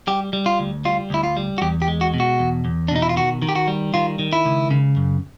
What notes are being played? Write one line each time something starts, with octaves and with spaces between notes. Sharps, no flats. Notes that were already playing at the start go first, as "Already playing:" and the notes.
G3 G4
G3
F4
D2
G3 F4
D2 E4
F4
G3
F#4
E2 G4
G4
G#3
F#4
B2
F#4
E2
E2
D4
B2 D#4
E4
F4
D#3 F#4
D#3
G4
F#4
G3
D#3 F4
D#3
E4
C#2
C#3
F#2